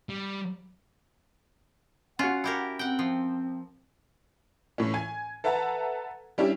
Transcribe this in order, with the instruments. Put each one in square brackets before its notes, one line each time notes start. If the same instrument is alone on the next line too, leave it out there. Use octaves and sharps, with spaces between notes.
[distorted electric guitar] G3
[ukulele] C#4 F#4 [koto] F4 [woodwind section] F#5
[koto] E4 G4 A#4
[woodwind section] C4 [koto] F#5 G5
[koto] F3
[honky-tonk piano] A2 E3 C#4
G#5 G#6
A4 B4 E5 F#5 A5 A#5
G3 C#4 D4 E4 G4